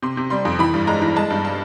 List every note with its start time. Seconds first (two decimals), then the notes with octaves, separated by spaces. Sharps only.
0.02 C3 C6
0.17 C3
0.30 G3 C6
0.45 F2
0.59 E3 B5
0.74 G2
0.87 G#3 A#5
1.02 E3
1.16 G#3 A5
1.30 G2
1.45 A5